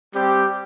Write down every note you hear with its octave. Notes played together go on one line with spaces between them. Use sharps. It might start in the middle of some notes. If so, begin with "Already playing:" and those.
G3 C4 G4